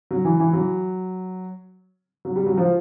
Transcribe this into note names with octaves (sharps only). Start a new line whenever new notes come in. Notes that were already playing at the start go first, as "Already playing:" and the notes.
F#3
E3
E3
F#3
F#3
G3
F#3
F3